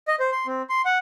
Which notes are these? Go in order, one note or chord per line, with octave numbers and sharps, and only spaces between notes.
D#5
C5
C6
C4
C6
F#5